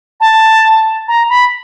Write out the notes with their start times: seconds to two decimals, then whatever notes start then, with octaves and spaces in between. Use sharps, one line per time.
0.21 A5
1.08 A#5
1.30 B5